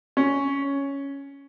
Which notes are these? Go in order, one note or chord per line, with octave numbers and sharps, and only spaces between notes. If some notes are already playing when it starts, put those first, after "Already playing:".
C#4